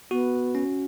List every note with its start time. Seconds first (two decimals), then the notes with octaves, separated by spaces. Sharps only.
0.11 B3 F#4
0.55 C#4